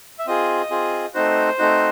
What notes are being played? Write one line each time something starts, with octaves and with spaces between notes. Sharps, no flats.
E5
C4 F4 G#4 D#5
C4 F4 G#4
A3 C4 D#4 F#4 C5
A3 C4 D#4 F#4